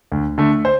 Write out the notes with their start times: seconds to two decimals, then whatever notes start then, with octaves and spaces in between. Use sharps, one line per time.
0.12 D2
0.38 D3 A3
0.65 C5